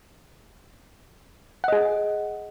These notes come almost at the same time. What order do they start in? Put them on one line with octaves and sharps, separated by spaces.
F#5 D#5 G#4